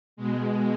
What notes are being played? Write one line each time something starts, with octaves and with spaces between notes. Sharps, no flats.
B2 G#3